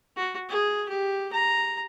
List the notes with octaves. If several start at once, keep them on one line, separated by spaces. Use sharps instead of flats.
F#4
G#4
G4
A#5